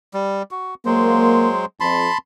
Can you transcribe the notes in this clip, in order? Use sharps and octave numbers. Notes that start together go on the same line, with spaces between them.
G3
F#4
F#3 G#3 A#3 C5
F2 A5 B5 C6